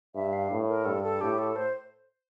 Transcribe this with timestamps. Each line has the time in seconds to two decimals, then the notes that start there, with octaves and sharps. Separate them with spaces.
0.15 G2 E5
0.33 F5
0.51 A2
0.69 A#4
0.85 G2 A4
1.04 A4
1.21 A2 G4
1.38 A4
1.56 C5